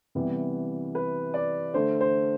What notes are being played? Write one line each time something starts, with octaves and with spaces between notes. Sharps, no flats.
C3 E3 G3 B3
B4
D5
D3 A3 C5
C5